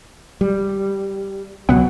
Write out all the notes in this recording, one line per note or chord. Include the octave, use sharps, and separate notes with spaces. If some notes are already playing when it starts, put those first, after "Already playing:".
G3
C#2 B2 F#3 B3 F#5